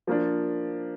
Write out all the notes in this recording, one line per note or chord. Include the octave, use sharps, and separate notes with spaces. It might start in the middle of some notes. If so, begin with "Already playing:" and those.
F3 A#3 D4